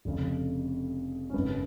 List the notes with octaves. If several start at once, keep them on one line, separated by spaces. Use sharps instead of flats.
F1 F2 C#3
C#4
G#1 F#2 C#3 B3